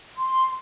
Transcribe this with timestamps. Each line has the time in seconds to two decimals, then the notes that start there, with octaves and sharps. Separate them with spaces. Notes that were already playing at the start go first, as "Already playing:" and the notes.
0.16 C6